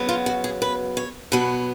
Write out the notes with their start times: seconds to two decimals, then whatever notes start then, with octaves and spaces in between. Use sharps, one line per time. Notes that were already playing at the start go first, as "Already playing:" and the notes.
Already playing: C#3 F#3 B3
0.09 F4
0.26 F#4
0.44 G#4
0.62 B4
0.97 C#5
1.32 B2 F#3 B3 B4